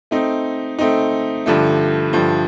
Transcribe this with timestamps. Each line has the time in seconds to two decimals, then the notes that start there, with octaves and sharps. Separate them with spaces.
0.11 A3 C4 D#4
0.79 A3 C4 D#4
1.46 G2 D3 F3 A3
2.13 G2 D3 F3 A3